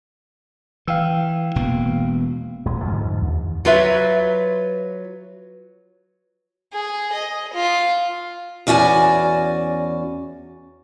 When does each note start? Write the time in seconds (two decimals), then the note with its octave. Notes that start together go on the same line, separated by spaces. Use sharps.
0.88 E3 F5 G5 E6
1.56 E1 B2 A#3
2.65 D#1 G#3
2.85 F2 G#2 D3
3.22 D#2
3.65 F#3 F4 B4 E5
6.73 G#4
7.13 D#5
7.53 F4
8.67 E2 C#4 F#4 D5 G#5